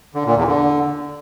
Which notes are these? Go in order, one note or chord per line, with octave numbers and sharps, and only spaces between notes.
D3
A#2
E2
D3